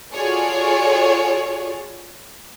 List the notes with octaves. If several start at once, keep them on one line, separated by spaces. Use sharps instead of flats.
F4 F#4 G#4 A4 C#5 D5